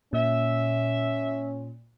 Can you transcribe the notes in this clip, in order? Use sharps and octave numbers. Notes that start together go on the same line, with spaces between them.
A#2 C#4 E5